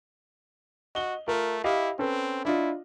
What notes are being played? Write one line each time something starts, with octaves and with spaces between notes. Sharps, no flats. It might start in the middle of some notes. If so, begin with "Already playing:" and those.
F#4 D#5 G7
A3 F4 A#4
E4 G4 D#5 F5
C4 C#4 A4 B4
D4 E4 F4 D#5